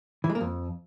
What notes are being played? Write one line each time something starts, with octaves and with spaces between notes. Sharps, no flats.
E3
G#3
A#3
F2